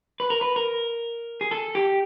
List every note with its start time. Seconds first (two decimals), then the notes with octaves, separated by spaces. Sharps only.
0.20 B4
0.30 A#4
0.41 B4
0.56 A#4
1.41 G#4
1.51 A4
1.75 G4